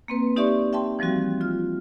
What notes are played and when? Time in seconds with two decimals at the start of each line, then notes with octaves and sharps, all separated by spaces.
0.08 A#3 C4 B4
0.36 D#4 G4 D5 E5 C6 C#6
0.73 E5 G5 A5 C6
0.99 E3 F3 G3 C4 F#4
1.41 F4 F6